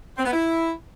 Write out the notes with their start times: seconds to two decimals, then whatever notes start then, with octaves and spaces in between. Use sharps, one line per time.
0.17 C4
0.25 B3
0.33 E4